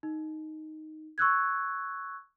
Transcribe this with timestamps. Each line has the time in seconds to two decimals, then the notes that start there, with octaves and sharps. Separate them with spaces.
0.03 D#4
1.18 C#6 E6 F#6 G#6